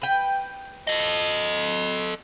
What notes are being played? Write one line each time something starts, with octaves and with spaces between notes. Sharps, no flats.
B4 G5
A4 D#5